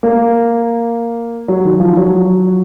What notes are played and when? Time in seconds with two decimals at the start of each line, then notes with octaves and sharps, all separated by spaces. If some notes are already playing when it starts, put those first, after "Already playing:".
0.03 A#3
1.48 F#3
1.65 D#3
1.80 F3
1.97 F#3